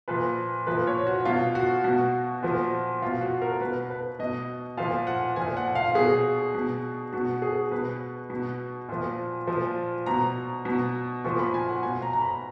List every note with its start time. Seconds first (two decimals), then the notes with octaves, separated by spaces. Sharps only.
0.08 A#2 F3 B4
0.67 A#2 F3 B4
0.87 C#5
1.07 F#4
1.25 B2 F4
1.55 F#4
1.84 B2 F#4
2.43 A#2 F3
3.02 B2 F4
3.21 F#4
3.42 A#4
3.61 B2 B4
3.90 B4
4.19 B2 D#5
4.77 A#2 F3 F5
5.07 F#5
5.36 A#2 F3 G#5
5.57 F#5
5.75 F5
5.95 B2 G#4
6.55 B2
7.13 B2 F#4
7.42 G#4
7.71 B2 B4
8.30 B2
8.89 A#2 F3
9.47 A#2 F3
10.06 B2 A#5
10.65 B2
11.24 A#2 F3 C#6
11.39 B5
11.54 G#5
11.69 F#5
11.82 B2 G#5
12.02 A#5
12.13 A#5
12.22 B5